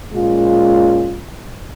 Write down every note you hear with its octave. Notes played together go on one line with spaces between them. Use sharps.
A#2 G#3 C#4 F4